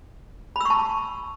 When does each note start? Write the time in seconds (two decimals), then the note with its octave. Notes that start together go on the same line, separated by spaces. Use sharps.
0.56 B5
0.61 E6
0.65 C#6
0.70 A5